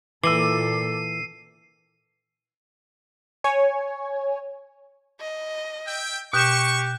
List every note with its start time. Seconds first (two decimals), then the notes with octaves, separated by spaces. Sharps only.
0.24 A#2 E3 A4 D6 E6 C7 D#7
3.44 C#5 G#5
5.20 D#5
5.86 E5 G5
6.33 B2 G4 C#6 F#6 G6 E7